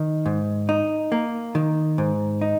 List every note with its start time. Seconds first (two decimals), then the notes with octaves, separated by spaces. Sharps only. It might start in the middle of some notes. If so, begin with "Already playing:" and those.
Already playing: D#3
0.26 G#2
0.69 D#4
1.12 A#3
1.55 D#3
1.98 G#2
2.41 D#4